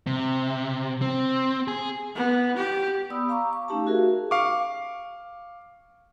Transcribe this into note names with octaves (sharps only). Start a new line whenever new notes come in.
C3
C4
G#4
B3
G4
B3 D5 B5 D#6 E6
F5 A#5 C#6 D6 E6
C#6
A3 C#4 D#4 G4 F5 A5
F#4 G#4 A#4 E5
F5 C#6 D6